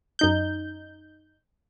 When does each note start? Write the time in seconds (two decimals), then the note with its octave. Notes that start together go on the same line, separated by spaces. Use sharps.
0.19 F#2 D#4 G6